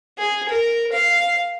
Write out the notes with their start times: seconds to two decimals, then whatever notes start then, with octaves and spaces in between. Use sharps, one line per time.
0.18 G#4
0.49 A#4
0.92 F5